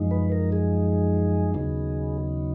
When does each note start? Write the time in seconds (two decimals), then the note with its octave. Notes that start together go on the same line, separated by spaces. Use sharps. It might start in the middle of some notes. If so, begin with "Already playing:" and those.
Already playing: F#2 F3 G#3 D#4
0.11 B4
0.32 A#4
0.52 G#4
1.54 D#2 C#3 F#3 B3 D#4